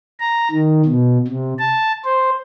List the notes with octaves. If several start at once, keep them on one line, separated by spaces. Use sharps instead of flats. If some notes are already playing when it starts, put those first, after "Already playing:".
A#5
D#3
B2
C3
A5
C5